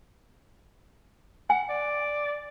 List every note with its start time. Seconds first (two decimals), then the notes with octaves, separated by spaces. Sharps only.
1.50 F#5 G#5
1.69 D5